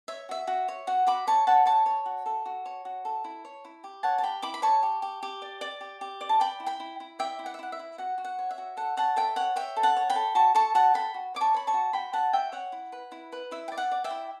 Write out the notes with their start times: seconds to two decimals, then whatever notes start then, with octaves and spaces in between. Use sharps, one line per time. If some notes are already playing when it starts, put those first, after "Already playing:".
0.08 C#5 E5
0.29 F#4 E5
0.47 F#4
0.68 C#5
0.87 F#4 F#5
1.07 F#4 B5 D6
1.27 C#5 A5 C#6
1.47 C#5 F#5 A5
1.66 C#5 A5 C#6
1.86 C#5
2.06 F#4
2.26 A4
2.46 F#4
2.66 C#5
2.85 F#4
3.05 A4
3.24 E4
3.45 C#5
3.65 E4
3.84 G4
4.03 C#5 F#5 A5
4.18 A5
4.22 G4 G5 B5
4.42 E4 B5 D6
4.54 B5
4.62 C#5 A5 C#6
4.83 G4
5.02 G4
5.23 G4
5.42 D5
5.61 D5
5.81 G4
6.01 G4
6.21 D5
6.29 A5
6.40 D5 G5 B5
6.60 E4
6.66 G5 B5
6.80 E4
7.00 E4
7.19 D5 E5 G5
7.39 E4
7.46 F#5
7.54 E5
7.59 E4 F#5
7.72 E5
7.79 E4
7.98 F#4 F#5
8.18 F#4
8.25 F#5
8.39 C#5
8.51 E5
8.58 F#4
8.77 A4 F#5
8.97 C#5 F#5 A5
9.16 A4 E5 G5
9.36 C#5 F#5
9.56 C#5 E5 G5
9.76 A4
9.83 F#5 A5
9.97 C#5
10.10 G5 B5
10.16 A4
10.35 F#4 A5 C#6
10.55 A4 A5 C#6
10.75 F#4 F#5 A5
10.94 A4 G5 B5
11.14 F#4
11.35 C#5 D6
11.41 A5 C#6
11.54 C#5 B5
11.67 A5 C#6
11.74 F#4
11.93 F#4 G5 B5
12.13 F#4 F#5 A5
12.33 F#4 E5 G5
12.52 C#5 F#5
12.72 E4
12.92 B4
13.12 E4
13.32 B4
13.51 E4 E5
13.68 G5
13.72 D5
13.78 F#5
13.91 D5
14.04 E5 G5
14.10 E4